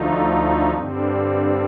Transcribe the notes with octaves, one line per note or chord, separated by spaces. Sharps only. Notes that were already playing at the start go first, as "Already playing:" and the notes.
Already playing: D2 D3 F3 A3 D#4
G2 D3 G3 C4